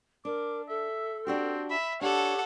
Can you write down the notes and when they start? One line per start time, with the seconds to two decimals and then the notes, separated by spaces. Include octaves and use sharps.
0.25 D4 A#4 D6
0.69 A4 E5
1.27 C4 D4 F#4 G4
1.70 E5 B5
2.01 D4 G4 A4 C#5 F#5